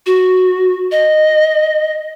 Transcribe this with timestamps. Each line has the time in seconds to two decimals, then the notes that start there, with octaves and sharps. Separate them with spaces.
0.06 F#4
0.92 D#5